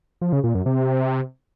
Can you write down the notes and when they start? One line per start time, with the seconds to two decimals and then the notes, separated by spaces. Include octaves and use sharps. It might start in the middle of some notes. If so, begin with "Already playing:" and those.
0.21 F3
0.33 C#3
0.44 A#2
0.55 F#2
0.66 C3